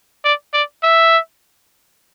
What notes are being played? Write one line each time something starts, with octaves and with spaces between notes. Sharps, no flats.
D5
D5
E5